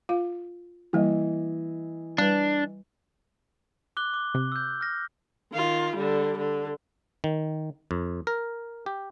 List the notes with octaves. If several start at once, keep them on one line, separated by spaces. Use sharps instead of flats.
F4 F5
E3 G3 A#3 D#5
G3 D4 B4
D6 F#6 G7
D6
C3
E6 G6
F6 A#6
D#3 F4
D3 G3
D3
D#3
F2
A#4
G4